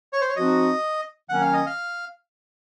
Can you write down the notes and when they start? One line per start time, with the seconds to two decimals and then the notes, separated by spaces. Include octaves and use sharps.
0.13 C#5
0.21 C5
0.28 C#5
0.36 F3 C4 D#4 F#4 D#5
1.29 D#3 F#3 A#3 C#4 F#5
1.41 F5
1.53 D#5
1.66 F5